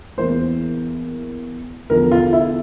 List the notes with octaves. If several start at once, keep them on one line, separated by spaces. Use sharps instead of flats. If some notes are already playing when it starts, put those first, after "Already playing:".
E2 E3 A#3 C5
E2 D3 F3 A#4
F4
E4